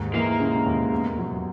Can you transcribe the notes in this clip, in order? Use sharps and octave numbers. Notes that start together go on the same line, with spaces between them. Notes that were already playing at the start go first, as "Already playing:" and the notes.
Already playing: D#2 G#2
E3 A#3
C#3
D#2
E2
F#3